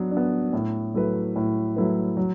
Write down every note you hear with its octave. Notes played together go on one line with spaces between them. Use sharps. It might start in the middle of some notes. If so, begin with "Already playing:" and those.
Already playing: F#3 B3 D4
D4
B3
A2
F#3 A3 E4 B4
A2
F#3 A3 E4 B4
F#3